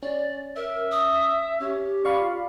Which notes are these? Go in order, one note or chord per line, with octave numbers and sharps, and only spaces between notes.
C#4 D5
A#4 E5
D#6
C#4 G4
D5 F5 B5 C#6
F4